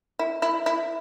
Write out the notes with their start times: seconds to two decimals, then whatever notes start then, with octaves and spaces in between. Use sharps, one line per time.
0.19 E4
0.42 E4
0.66 E4